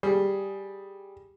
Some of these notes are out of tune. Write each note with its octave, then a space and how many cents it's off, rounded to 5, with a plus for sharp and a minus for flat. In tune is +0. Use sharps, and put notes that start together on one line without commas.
G3 +0 G#4 +0